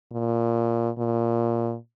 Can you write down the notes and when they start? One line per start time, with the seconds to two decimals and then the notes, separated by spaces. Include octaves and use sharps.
0.12 A#2
0.98 A#2